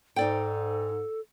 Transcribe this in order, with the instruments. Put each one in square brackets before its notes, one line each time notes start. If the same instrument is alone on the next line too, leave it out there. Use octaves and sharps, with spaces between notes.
[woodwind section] G#2 [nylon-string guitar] D#4 D5 G5 [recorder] A4